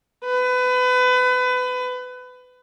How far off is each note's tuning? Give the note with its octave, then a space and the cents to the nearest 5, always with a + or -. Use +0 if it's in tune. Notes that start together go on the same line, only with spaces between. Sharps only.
B4 +30